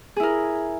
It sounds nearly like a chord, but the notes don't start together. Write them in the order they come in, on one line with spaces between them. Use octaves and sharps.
G#4 E4 A#4